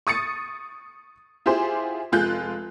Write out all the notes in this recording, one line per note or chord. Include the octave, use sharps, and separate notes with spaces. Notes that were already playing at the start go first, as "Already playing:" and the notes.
C#6 D#6 A6 C#7
E4 F4 G4 G#4 C5
F1 G#3 F4 F#6 G6